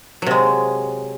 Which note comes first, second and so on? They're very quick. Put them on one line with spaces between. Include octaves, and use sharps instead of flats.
F#3 C3 G#3